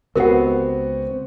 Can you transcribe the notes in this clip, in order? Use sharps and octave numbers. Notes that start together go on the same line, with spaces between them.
C#2 B3 C4 F#4 G4 A#4 F#5